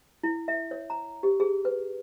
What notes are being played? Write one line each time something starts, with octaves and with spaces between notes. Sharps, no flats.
E4
E5
C#5
A#5
G4
G#4
B4